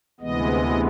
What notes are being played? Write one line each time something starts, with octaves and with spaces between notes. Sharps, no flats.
D2 C3 E3 G#3 B3 D#5